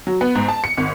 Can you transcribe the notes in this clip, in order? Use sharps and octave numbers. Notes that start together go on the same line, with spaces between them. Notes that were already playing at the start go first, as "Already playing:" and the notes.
F#3
B3
G#2
A5
C#7
G#1